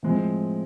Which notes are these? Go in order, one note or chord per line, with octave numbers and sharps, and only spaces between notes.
A2 F3 G#3 C4